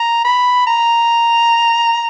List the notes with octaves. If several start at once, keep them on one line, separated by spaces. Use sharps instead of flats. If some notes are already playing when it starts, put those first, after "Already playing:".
Already playing: A#5
B5
A#5